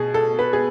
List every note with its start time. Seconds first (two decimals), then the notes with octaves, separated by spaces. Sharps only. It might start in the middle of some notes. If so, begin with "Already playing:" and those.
Already playing: B2 G#4
0.14 A4
0.39 B4
0.53 G#4